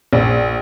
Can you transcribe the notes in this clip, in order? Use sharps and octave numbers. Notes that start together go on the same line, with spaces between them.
A#1